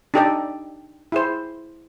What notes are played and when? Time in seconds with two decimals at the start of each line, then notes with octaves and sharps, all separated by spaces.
0.14 D4 D#4 G4 A4 D5 D#5
1.12 E4 G#4 C5